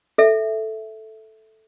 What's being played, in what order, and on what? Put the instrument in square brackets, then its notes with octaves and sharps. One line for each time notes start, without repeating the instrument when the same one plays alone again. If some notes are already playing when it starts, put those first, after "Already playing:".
[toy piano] A4 E5